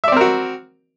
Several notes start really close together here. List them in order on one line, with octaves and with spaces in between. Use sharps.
E5 D5 C4 A#4 F#4